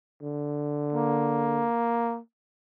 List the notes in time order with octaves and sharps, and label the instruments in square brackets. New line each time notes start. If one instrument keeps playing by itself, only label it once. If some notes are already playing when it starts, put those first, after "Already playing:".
[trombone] D3
[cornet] A#3